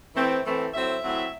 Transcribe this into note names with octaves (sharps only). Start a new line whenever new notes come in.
A2 E3 A3 C4
A2 E3 A3 C4
A2 F#3 C4 E5
A2 F#3 C4